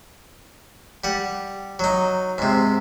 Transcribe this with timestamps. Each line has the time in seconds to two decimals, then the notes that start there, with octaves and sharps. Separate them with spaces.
1.04 G3 F#5
1.79 F#3 D#4
2.38 G#2 C3